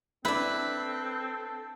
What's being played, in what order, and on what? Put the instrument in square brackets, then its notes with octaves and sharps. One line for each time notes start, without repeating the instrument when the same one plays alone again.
[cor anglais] C4 [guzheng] D4 E4 [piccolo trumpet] A4 [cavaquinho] B4